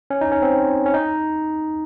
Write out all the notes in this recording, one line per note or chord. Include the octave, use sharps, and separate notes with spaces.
C#4
D#4
C#4
C4
C#4
D#4